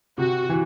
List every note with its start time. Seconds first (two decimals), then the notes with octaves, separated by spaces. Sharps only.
0.18 C3 F#4
0.49 E3